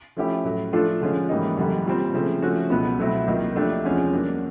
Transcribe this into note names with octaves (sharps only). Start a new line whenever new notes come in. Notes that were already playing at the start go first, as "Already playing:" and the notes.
F3 A3 C#4 E4 G4
A2 F#3 A3
F3 A3 D4 F4 A4
D3 F3 G#3 C#4
G#2 E3 G3 A#3 D#4
F#2 D3 G3
A#2 G3 C4
C#3 F3 A3 C4
F3 A3 C#4 F#4
C#2 B2 F#3 B3
B2 F#3 A3 C4 E4
C#2 C3 D#3 F#3 A#3
F3 A3 D4 G4
E2 C3 F3 G#3 C#4
F#3 A#3 D4